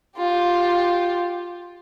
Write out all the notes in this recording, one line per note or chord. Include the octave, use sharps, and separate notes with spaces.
F4 G4